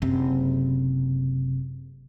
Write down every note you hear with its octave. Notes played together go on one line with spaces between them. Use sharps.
F#1 C3